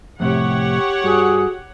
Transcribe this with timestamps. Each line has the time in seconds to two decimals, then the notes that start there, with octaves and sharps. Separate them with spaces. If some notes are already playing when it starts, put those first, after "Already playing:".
0.20 F2 A2 C3 G4 C#5 F#5
1.04 G2 F#4 G#4